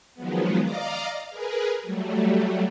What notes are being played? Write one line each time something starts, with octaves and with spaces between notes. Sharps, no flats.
D#3 F3 F#3 G#3 B3
D5 D#5 F5 A#5 D6
G#4 A#4 B4
F#3 G3 A3